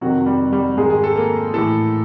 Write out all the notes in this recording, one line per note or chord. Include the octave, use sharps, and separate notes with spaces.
F2 C3 D#3 F#3 F#4
G3 G4
G3 G4
G#2 D#3 G#3 G#4
G#4
A4
A#3 A#4
A2 E3 A3 A4